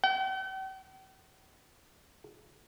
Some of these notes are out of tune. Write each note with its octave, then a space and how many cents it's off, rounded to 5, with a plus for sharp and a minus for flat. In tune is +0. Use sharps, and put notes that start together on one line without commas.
G5 -45